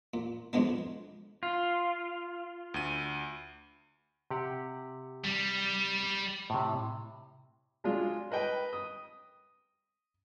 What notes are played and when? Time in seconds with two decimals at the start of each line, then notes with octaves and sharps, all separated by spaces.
0.14 A#2
0.53 F2 G#2 B2 G#3 B3 D4
1.43 F4
2.74 D2 D#7
4.30 C3 G4 F#5
5.25 G3
6.50 A2 C3
7.84 F#3 G#3 D4 F4
8.31 A#4 B4 D#5 G5
8.73 D#6